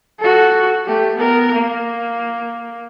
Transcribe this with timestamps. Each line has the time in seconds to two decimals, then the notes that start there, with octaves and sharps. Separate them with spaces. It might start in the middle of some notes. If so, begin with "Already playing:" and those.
0.19 F#4 A4
0.86 A3 G4
1.16 B3 A#4
1.53 A#3